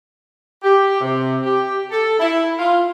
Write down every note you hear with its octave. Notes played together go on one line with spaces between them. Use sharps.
G4
C3
G4
A4
E4
F4